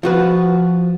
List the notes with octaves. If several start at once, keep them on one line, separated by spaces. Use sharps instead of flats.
F3 F#4 B4